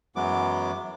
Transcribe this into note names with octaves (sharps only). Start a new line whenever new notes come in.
F#2 E3 F#3 G#3 B3 D6